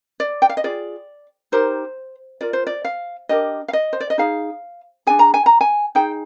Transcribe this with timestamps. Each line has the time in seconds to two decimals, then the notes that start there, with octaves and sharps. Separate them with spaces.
0.20 D5
0.42 G5
0.49 F5
0.57 D#5
0.64 F4 G#4 D5
1.52 D#4 G4 A#4 C5
2.41 F4 A#4 D5
2.53 C5
2.67 D5
2.85 F5
3.29 D4 G4 A#4 D#5
3.68 F5
3.73 D#5
3.93 C5
4.00 D5
4.10 D#5
4.18 D#4 G#4 F5
5.07 D4 G#4 G#5
5.19 A#5
5.34 G#5
5.46 A#5
5.61 G#5
5.95 D#4 G#4 G5